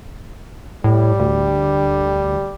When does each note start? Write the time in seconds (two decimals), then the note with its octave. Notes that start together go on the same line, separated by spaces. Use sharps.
0.84 A2 G3
1.20 D2